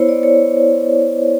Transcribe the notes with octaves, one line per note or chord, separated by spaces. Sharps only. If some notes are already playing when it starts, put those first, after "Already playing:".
Already playing: B3 E4 C5 C#5
D5
C#5